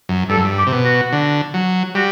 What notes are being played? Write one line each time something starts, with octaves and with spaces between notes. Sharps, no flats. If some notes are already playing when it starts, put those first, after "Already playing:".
F#2
G2 A4
F#2
G2
G4
C3
B2
F#4
D3
F#3
G3 F#4